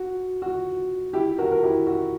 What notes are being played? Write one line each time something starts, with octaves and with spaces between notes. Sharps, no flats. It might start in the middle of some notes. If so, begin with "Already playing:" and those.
Already playing: F#4
F#4
E4 G4
F#4 A#4
A#4
E4 G4
F#4